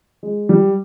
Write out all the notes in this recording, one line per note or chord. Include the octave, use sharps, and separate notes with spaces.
G#3
G3